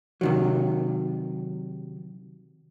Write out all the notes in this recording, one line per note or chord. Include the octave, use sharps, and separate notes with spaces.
C3 D#3 F#3